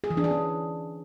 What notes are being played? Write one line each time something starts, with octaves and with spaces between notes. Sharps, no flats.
G#4
E3
D4
G#4
C#4